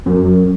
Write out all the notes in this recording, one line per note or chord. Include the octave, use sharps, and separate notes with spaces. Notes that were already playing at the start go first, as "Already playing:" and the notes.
F#2